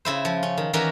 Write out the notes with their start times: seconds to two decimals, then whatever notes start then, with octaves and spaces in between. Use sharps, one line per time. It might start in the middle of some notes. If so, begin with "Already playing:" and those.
0.05 C#3 E4 C5
0.25 F3
0.43 C#4
0.57 D#3
0.73 D#3 E3 C#4 F#4 G4 A#4